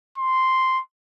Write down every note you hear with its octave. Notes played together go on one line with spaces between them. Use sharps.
C6